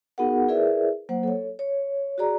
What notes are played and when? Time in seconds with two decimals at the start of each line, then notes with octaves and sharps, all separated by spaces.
0.18 B3 D#4 F#4 G#4 A#4 F#5
0.48 E4 G#4 A#4 B4 D5 E5
1.09 F#3 A#3 C5 F#5
1.23 A4 C#5
1.59 C#5
2.18 F#4 G#4 D5 A#5